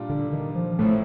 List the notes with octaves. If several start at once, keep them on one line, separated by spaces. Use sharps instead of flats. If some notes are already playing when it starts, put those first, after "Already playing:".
Already playing: A#2 G3 D4 F4
D3
D#3
F3
A1 A2 F3 A3 C4